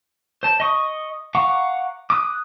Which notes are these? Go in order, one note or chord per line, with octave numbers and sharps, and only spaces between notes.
C5 A5
D#5 C#6 D#6
F5 F#5 A#5 C#6 D6
D6 D#6 F#6